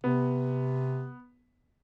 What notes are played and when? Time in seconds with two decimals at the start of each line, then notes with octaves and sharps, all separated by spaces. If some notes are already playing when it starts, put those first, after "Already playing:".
0.04 C3 B3